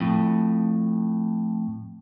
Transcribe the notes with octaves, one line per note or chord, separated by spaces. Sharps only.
F2 A2